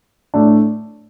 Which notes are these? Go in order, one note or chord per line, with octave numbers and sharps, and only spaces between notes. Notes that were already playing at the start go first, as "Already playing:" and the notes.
A2 A3 D4